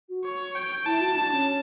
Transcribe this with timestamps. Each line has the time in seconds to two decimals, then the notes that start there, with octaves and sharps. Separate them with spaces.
0.09 F#4
0.25 C#5
0.55 G5
0.86 E4 A5
1.01 F#4
1.16 D4 A5
1.31 C#4